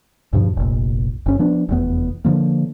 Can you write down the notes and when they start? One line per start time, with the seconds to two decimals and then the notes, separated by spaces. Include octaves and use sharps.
0.33 D2 G2 B2 F3
0.57 F1 A#1
1.26 F#1 C#4
1.39 F3 B3 D4
1.69 F1 E2 B3
2.25 D3 F3 A#3